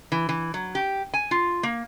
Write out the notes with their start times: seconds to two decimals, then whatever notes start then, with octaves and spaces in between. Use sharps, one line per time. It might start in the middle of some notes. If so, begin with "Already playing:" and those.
0.12 E3
0.29 E3
0.54 F#3
0.75 G4
1.14 G#5
1.31 F4
1.63 A#3